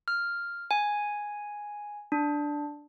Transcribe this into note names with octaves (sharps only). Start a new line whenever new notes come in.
F6
G#5
D4